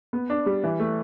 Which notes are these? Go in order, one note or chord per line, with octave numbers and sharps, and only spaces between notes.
B3
D4
G3
E3
A3